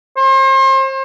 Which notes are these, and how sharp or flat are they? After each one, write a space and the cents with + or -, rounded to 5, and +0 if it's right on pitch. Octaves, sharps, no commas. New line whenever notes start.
C5 +35